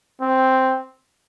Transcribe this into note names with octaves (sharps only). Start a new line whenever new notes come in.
C4